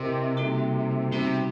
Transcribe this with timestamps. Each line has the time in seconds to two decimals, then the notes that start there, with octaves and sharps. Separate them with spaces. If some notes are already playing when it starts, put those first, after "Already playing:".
Already playing: C3 C4 E4 G4 A#4 D#5
0.37 G3 A#3 D#4 F#4 A4
1.12 C3 G3 B3 D#4 F#4